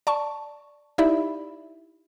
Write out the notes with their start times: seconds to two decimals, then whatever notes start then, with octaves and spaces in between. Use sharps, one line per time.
0.07 D5 A5 C#6
0.98 D#4 E4 G4 D5 E5 B5